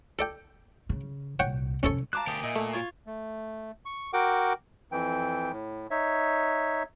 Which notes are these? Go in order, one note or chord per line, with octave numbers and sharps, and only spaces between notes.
A4 D5 G5
C#3
C2 A#2 C#5 F#5 G5
F2 C3 C#4 A4 C#5
C5 F5 A5 A#5 D6 F#6
D2 G4 A#4 G#5 D#6
A#2 D#4 E5
A3
F4 C#5
A3
C#6
F#4 A#4 F#5 G5 D6
F2 E3 G5
A2
D#4 C#5 E5